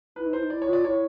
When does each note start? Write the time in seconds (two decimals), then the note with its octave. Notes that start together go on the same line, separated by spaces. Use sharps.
0.16 E4 B4
0.25 D#4
0.33 E4 C5
0.42 D#4
0.50 E4 D5
0.62 C#5
0.67 F4
0.73 D5
0.84 E4 C#5